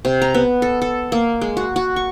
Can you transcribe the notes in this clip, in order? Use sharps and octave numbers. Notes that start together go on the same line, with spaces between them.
C3
A#5
B3
A4
A4
A#3
G#3
F#4
F#4
C#6